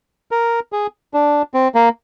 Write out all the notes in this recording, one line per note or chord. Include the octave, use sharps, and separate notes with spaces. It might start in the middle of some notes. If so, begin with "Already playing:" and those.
A#4
G#4
D4
C4
A#3